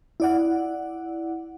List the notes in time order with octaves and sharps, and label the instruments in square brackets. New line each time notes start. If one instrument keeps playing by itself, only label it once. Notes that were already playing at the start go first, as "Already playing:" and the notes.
[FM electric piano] E4 D5 F#5